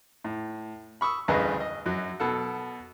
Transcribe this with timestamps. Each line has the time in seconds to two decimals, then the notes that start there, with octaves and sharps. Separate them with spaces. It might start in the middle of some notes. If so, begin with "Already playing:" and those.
0.24 A2
1.01 B5 C#6 D#6 E6
1.28 A1 D2 G2 G#4 B4 D#5
1.60 D#5
1.86 F#2 F#3
2.20 B2 A4 F#5